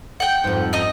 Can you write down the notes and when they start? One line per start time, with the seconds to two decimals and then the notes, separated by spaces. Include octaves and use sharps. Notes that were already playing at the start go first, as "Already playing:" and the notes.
0.20 F#5 G5
0.44 F2 G#2
0.73 D#4 D#5